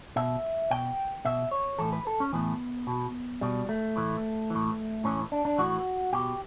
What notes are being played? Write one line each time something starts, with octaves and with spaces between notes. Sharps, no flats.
B2 E5
B2 G5
B2 E5
C#5
A2 E3 A4
B4
A4
C#4
A2 E3 B3
B2
B2 G3
A3
A2 E3
A2 E3
A2 E3 C#4
D4
D4
A2 E3 F#4
B2 G4